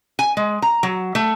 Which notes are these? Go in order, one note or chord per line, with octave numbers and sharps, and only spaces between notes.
G#5
G#3
A#5
F#3
A3